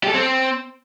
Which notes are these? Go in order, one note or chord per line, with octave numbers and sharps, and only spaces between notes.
G4
A4
C4